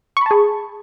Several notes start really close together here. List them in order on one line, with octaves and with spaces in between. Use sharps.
C#6 B5 A5 G#4